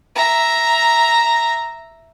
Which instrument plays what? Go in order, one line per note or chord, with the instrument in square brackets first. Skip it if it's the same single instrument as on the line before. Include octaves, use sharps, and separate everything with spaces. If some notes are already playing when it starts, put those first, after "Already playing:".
[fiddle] E5 A#5